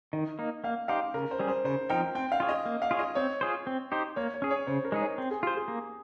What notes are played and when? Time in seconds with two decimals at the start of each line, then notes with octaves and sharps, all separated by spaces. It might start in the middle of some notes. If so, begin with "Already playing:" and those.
0.13 D#3 D#5
0.39 A#3 D#4
0.64 A#3 F5
0.88 D#4 G4 C5 F5
1.14 C#3 A#4
1.31 C5
1.39 G3 C#4 G#4
1.48 C5
1.64 C#3 C5
1.90 F3 C4 D#4 A#4 G5
2.15 C4 G5
2.32 F5
2.40 F4 G#4 C#5
2.49 D#5
2.66 A#3
2.82 F5
2.91 F4 G#4 C#5
2.99 D#5
3.15 C4 C#5
3.41 F4 G#4 C5
3.67 C4
3.92 D#4 G4 C5
4.16 A#3 C#5
4.34 C#5
4.42 C#4 G#4
4.50 C#5
4.67 C#3 C5
4.85 A#4
4.92 G#3 D#4 G#4
5.02 C#5
5.18 C4
5.31 G#4
5.43 F4 G4 C5
5.56 G#4
5.68 A#3